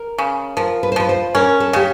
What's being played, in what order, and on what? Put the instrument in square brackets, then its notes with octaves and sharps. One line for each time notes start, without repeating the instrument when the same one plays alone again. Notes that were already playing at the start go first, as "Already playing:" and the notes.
Already playing: [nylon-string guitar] A#4
[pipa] C#3
[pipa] F3 [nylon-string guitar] A#4
[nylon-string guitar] B4
C5
[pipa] F3 [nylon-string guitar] B4
[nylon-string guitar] C5
[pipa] C#4 [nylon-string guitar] A#4
[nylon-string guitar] A4
[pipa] C#3 [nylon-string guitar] G4